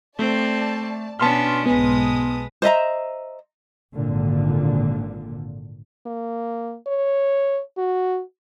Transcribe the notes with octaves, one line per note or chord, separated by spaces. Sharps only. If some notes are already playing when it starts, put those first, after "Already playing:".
A3 C4 D5 A5
B2 B3 C#4 D4 A5 C6 F6
B1 G#2 G#3 B3 B4 D#6
C5 D#5 E5 A#5
G#1 A#2 D3
A#3
C#5
F#4